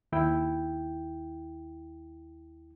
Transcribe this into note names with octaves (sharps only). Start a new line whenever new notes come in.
D#2 E4 G5